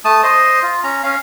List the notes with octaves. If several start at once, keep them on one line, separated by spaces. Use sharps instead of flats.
A3 A5 D#6
C5 D#5
F4
C#4 A#5
C#4 F5